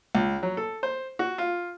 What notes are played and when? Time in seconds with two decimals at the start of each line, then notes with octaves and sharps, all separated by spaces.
0.15 C#2
0.43 F#3
0.57 A4
0.83 C5
1.19 F#4
1.38 F4